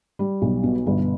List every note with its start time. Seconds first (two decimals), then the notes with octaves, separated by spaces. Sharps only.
0.19 G3
0.42 B1
0.64 B2
0.86 G1